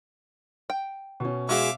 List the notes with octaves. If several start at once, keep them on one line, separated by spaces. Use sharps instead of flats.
G5
B2 C#4
G#3 F#4 G#4 E5 F5 D6